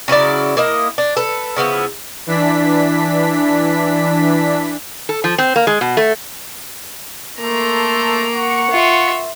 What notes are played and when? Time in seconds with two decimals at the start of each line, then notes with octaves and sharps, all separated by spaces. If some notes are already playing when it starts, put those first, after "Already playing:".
0.08 C#3 F#3 E4 D5
0.57 A#3 E4 D#5
0.98 D4
1.17 A4 B4
1.56 C#3 F3 B3 E4
2.27 E3 D4 B6
5.09 A4
5.24 F3
5.38 C4
5.56 A#3
5.67 G#3
5.81 B2
5.97 A3
7.40 A3 A#3 A4 A#5 C6
8.34 F#5 C#6
8.70 F4 E5